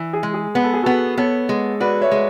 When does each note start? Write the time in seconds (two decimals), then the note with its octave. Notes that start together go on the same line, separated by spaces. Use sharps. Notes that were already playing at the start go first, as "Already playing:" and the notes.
Already playing: E3
0.13 G#4
0.23 G#3
0.34 G#4
0.55 B3 B4
0.64 A4
0.74 G#4
0.83 B3 F#4 A4
1.18 B3 A4 C#5
1.49 G#3
1.80 F#4 B4 D5
2.01 C#5 E5
2.11 G#3